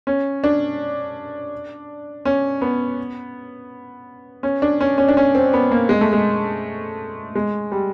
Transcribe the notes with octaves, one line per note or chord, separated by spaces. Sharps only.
C#4
D4
C#4
B3
C#4
D4
C#4
C#4
D4
C#4
C4
B3
A#3
G#3
A3
G#3
G#3
G3